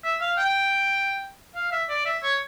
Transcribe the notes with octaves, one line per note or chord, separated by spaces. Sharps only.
E5
F5
G5
F5
E5
D5
E5
C#5